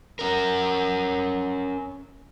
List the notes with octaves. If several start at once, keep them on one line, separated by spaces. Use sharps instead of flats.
C#4 A#4